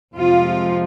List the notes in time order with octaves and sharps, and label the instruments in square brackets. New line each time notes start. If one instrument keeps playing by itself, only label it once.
[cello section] F2 C3 F3 G#3 F4